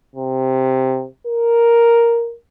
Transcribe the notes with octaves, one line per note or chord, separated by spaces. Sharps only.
C3
A#4